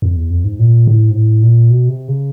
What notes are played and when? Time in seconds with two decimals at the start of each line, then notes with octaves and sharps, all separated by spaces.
0.02 F2
0.17 E2
0.31 F2
0.45 G#2
0.59 A#2
0.87 A2
1.10 G#2
1.15 A2
1.43 A#2
1.70 B2
1.89 C3
2.08 C#3